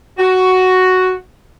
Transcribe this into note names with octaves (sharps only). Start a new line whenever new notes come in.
F#4